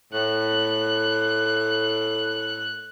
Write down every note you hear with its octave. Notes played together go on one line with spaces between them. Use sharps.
A2 F#6